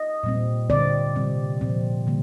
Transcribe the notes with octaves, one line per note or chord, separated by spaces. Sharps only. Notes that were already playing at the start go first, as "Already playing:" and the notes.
Already playing: D#5
A#2 G3 C4
D3 G3 C4 D5
C3 G3 C4
A#2 F3 C4
D3 G3 A#3